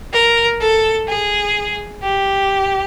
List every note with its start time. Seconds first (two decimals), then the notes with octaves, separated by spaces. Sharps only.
0.13 A#4
0.61 A4
1.08 G#4
2.02 G4